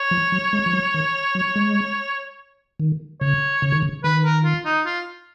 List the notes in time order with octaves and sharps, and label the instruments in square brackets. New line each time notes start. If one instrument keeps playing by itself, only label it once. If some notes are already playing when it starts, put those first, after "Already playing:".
Already playing: [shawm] C#5
[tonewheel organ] F3
F#3
G#3
F3
F#3
D#3
F#3
G#3
D#3
[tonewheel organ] C#3 [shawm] C#5
[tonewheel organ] C#3
D#3
C#3
[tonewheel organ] D#3 [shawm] B4
[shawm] A#4
F4
D#4
F4